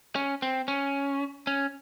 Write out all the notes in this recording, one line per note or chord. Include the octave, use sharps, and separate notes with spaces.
C#4
C4
C#4
C#4